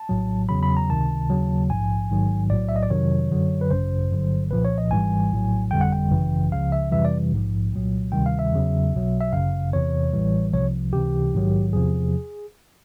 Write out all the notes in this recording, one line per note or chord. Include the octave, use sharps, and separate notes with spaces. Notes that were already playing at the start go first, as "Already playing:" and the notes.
Already playing: A5
A#1 A2 F#3
E2 C#3 F#3 B5
B5
A#5
C#2 C3 D#3 A5
D#2 C#3 F#3
A#1 G#2 F3 G#5
A1 G#2 D#3 F#3
B1 A2 F#3 D5
E5
D#5
D5
F2 C3 D#3 F#3 C#5
F#2 D3 F#3
B4
G#1 F#2 C#3 C5
G1 G2 D3 F#3
C2 A#2 F3 B4
C#5
D#5
G#1 G#2 E3 G3 G#5
A#1 A2 F#3
G1 F2 D3 G3 G5
F#5
G5
G#1 F#2 C#3 E3
C#2 C#3 F3 F5
E5
F2 C3 E3 G3 E5
D5
A#1 G#2 F3
C2 A#2 F#3
D2 C3 D#3 G3 G5
F5
E5
E2 C#3 F#3
B1 B2 F#3
E5
G1 F#2 C#3 F5
E2 C3 E3 C#5
A1 A2 E3 G3
C2 C3 F3 C#5
C#2 C3 E3 G4
A#1 G#2 D#3 F#3
E2 C3 F3 G#4